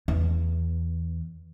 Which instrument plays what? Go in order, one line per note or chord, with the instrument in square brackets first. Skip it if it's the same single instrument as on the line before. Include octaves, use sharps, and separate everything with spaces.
[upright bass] E2